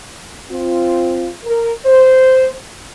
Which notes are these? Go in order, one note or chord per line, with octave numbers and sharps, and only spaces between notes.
C4 F4
A#4
C5